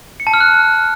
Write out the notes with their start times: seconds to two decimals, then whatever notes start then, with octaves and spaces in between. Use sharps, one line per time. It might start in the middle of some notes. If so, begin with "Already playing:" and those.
0.20 C#7
0.27 A5
0.34 F6
0.40 F#6